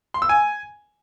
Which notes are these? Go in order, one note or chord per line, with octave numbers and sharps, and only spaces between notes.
C6
E6
G#5